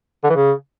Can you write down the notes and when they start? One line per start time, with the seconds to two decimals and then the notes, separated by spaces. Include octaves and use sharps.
0.24 D3
0.30 E3
0.36 C#3